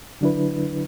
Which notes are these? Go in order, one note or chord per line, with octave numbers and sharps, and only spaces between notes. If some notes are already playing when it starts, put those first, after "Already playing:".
D3 F#3 D4 E4 B4